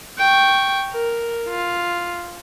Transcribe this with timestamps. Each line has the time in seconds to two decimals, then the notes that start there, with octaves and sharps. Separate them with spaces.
0.18 G5 C#6
0.91 A#4
1.49 F4